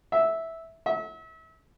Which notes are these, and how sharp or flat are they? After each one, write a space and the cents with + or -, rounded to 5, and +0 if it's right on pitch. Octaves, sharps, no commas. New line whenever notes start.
E5 -10
E5 -35